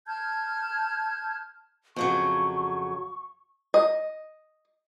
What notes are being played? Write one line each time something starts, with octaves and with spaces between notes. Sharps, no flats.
A5 F6 G6 G#6
F2 C#3 F#3 C#6
D#5